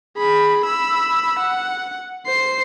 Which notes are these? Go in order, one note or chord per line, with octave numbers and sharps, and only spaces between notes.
G#4 B5
B5 E6
F#5
C5 C7